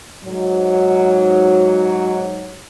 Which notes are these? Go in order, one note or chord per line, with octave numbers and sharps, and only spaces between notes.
G#2 F#3